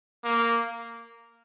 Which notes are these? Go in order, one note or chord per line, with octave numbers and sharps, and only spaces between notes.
A#3